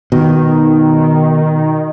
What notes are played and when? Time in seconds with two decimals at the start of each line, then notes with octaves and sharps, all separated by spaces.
0.12 B2 D#3